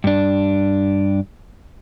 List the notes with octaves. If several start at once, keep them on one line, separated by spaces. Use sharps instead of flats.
G2 D4